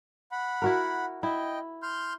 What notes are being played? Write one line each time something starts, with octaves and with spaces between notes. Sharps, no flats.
F#5 B5
E4 F#4 A#4
E4 D#5 G5
C6 F6 G6